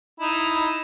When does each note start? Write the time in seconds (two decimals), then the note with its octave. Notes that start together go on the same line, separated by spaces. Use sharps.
0.20 D#4 E4